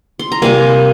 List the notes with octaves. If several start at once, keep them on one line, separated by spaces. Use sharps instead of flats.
C6
A#5
C3 G3 A#3 F5 G#5